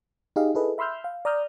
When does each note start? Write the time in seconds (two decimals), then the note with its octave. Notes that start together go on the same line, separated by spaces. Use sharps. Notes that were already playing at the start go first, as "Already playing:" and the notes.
0.36 D#4 G4 G#4 D#5 F5
0.55 E4 G#4 A4 B4 D#5
0.78 E5 B5 C6 E6 F6 G6
1.04 F5
1.25 D5 A#5 D#6 F6 G6